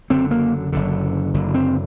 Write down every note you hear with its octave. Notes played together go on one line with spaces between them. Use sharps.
F#1 F#2 D3 C4
A#3
F#1 F#2 D3
F#1 F#2 D3
C4